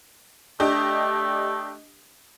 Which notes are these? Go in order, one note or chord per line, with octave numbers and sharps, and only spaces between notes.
A3 D4 G4 D#5